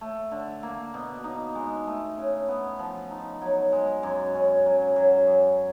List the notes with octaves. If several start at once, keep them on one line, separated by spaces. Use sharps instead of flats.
A3
D3
A#3
B2
D#4
G#3
A3
C#3
B3
F3
D#4
F#3
G#3
F#2
C#4
F#3
F#3
F#2